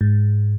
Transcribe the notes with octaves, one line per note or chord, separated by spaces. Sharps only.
G#2